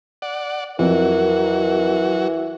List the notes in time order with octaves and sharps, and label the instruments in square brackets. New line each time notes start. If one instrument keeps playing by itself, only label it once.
[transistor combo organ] D5 F#5
[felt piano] F2 [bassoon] E3 [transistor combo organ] F#3 F#4 [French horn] A#4